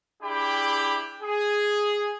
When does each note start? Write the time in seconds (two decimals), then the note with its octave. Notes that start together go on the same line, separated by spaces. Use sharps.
0.23 D4 E4 G4 G#4 G5 B5
1.23 G#4